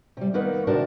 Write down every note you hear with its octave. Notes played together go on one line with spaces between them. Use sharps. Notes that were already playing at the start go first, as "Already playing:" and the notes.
C3 G3
D#3 A#3 B3 D#4 B4 F#5
C3 D#3 D4 F#4 A#4 A5